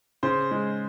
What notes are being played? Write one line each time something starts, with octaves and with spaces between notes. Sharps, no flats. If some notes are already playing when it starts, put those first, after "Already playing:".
C#3 C5
G#3